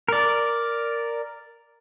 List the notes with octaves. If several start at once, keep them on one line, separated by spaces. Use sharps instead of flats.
A#4 D5